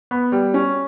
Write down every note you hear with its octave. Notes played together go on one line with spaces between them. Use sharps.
B3
G3
C#4